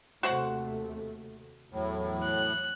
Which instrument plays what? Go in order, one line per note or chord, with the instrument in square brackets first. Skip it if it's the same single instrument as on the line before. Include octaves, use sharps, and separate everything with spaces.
[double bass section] D#2 C3 A3 [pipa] F#4 C5 F#5
[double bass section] E2 E3 F#3 [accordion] A2
[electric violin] F#6